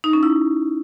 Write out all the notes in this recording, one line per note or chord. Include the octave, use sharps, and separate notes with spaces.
D#4
C#4
E4